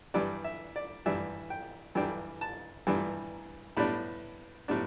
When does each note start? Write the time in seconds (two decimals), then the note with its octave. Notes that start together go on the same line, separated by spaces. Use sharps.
0.14 G2 E3 G3 D4 D5
0.44 E5
0.76 D5
1.06 G2 E3 G3 D4 E5
1.50 G5
1.95 G2 E3 G3 D4 G5
2.41 A5
2.87 G2 E3 G3 D4
3.77 A2 G3 B3 D4 B5
4.68 A2 G3 B3 D4